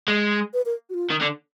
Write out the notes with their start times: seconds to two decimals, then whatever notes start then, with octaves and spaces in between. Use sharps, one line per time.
0.08 G#3
0.54 B4
0.66 A#4
0.90 F#4
0.94 F4
1.11 D#3
1.21 D3